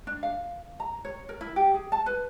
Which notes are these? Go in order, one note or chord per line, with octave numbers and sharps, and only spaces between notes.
D4
F5
A#5
C#5
A#4
E4
G4
G#4
A5
B4